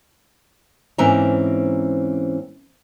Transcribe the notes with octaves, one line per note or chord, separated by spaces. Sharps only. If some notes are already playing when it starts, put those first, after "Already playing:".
G#2 E3 A#3 C4 C#4 A#5